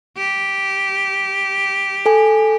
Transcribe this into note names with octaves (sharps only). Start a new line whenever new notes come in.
G4
A4 G#5